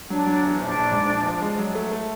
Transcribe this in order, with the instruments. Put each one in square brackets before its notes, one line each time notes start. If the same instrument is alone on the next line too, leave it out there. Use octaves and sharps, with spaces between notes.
[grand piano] F#3 [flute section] D4
[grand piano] F#3
E2
[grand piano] A#1 [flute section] D4
[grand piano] A#1
G#2
A#1
F3
G#3
F#3
A3
A3